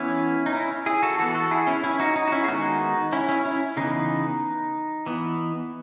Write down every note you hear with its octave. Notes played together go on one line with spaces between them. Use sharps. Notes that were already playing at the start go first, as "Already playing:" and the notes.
Already playing: E3 B3 C#4 E4
D#4
C#4 E4
E4 G#4
F#4 A4
E3 B3 F#4 A4
F#4 A4
E4 G#4
C#4 E4
C#4 E4
D#4 F#4
D#4
F#4
C#4 E4
G#4
D#3 G#3 B3 D#4 F#4
C#4 E4
C#4 E4
C#4 E4
C#3 E3 B3 D#4
E3 B3